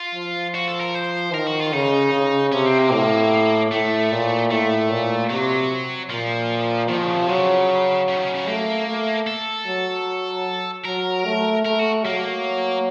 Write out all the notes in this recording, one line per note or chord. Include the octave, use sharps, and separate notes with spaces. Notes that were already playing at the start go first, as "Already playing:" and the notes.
Already playing: F4
F3
F#4
A4
A#4
C5
D#3 A#4
F#4
F4
C#3 D#4
C#3
C3 C#4
C4
A#3
A2
A2 A3
A#2
A2 A3
A#2
C3 F#3
A#2 F3
D#3 F3
C#3
C3
C#3 F#3
C#3
D#3
C#3
C#3
A3 A#3
A3
A4
F#3
F#3 A#4
A3
A3 A#4
F#4
F#3 A#3